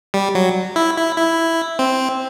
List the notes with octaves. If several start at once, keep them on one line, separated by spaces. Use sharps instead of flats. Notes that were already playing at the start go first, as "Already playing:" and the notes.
G3
F#3
E4
E4
E4
C4